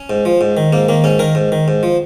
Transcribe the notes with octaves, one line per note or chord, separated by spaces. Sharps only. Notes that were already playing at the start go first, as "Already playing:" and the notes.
Already playing: C#4
G#2
F3
G#2
D#3
G#2 A#3
D#3 A#3
G#2 C#4
D#3 A#4
G#2
D#3
G#2
F3